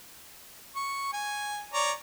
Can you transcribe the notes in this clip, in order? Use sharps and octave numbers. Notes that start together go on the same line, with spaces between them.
C#6
G#5
C#5 D5 A#5